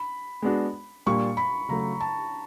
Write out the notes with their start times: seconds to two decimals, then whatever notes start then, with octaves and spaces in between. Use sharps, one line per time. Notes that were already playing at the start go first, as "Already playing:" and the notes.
Already playing: B5
0.42 G#3 B3 D4 F#4
1.06 A#2 G3 A#3 D4 G4 C#6
1.37 B5
1.69 C#3 F#3 A3 A#5
2.00 A5